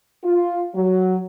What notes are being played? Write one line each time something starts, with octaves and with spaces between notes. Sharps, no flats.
F4
F#3